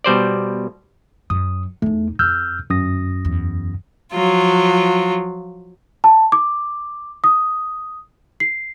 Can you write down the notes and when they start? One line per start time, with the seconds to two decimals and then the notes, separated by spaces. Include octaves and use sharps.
0.04 B2 G3 C5 D5
1.30 F#2 D#6
1.82 E2 A3 D#4
2.19 F2 E6 F6 G6
2.70 G1 F#2 D#6 A#6
3.25 E2
4.13 F3 F#3 F4
6.04 A5
6.32 D6
7.24 D#6
8.40 C7